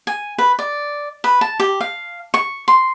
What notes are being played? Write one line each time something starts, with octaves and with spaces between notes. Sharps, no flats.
G#5
B4
D5
B4
A5
G4
F5
C#6
C6